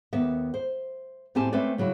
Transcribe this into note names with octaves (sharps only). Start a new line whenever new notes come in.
D#2 B3 E5
C5
A2 C4 G4 G#5 A5
A3 C4 C#4 B4 C#5 D5
C#3 F#3 G3 E4